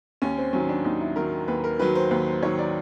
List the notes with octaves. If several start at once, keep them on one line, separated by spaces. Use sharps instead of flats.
D#2 C#4
C4
D#3 F#3 C#4
D4
D#2 D#4
E4
D#3 F#3 A#4
D#2 B4
A#4
D#3 F#3 B4
C5
D#2 B4
C5
D#3 F#3 C#5
D5